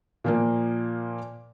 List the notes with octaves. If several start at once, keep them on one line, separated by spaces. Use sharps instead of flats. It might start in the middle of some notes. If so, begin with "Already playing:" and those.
A#2 F3 A#3